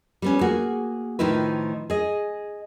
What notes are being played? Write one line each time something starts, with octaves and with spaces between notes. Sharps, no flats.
G3 B3 C#4
A#3 F#4 G#4
A2 D#3 F3 D#4 E4 B4
G#4 D#5